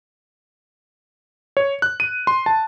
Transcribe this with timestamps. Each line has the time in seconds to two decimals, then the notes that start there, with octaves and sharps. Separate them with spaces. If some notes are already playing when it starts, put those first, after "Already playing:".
1.57 C#5
1.82 F#6
2.00 D#7
2.27 C6
2.46 A5